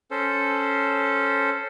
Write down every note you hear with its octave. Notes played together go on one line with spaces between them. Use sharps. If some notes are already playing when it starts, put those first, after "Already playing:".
C#4 A4 C5